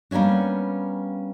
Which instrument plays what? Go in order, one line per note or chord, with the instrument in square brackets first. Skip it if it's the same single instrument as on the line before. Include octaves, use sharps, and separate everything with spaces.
[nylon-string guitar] G3 A#3 B3 C#4 D4